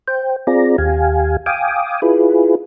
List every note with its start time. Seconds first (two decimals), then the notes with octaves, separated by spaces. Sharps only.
0.08 C5 G5
0.47 C4 F4 G#4 D5 A#5
0.78 D#2 G4 F5 G#5
1.46 F5 G5 G#5 D6 D#6
2.02 E4 F4 G#4 B4